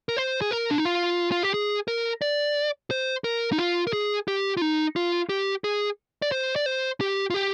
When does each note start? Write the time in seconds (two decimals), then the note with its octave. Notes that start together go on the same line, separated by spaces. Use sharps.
0.09 A#4
0.17 C5
0.41 G#4
0.51 A#4
0.71 D4
0.78 D#4
0.85 F4
1.32 F4
1.43 G4
1.54 G#4
1.88 A#4
2.22 D5
2.91 C5
3.24 A#4
3.52 D#4
3.58 F4
3.87 A#4
3.93 G#4
4.28 G4
4.57 F4
4.62 D#4
4.96 F4
5.29 G4
5.64 G#4
6.22 D5
6.32 C5
6.56 D5
6.66 C5
7.01 G4
7.30 F4
7.34 G4